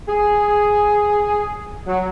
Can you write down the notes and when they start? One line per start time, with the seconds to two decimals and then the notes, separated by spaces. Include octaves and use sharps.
0.07 G#4
1.86 F#3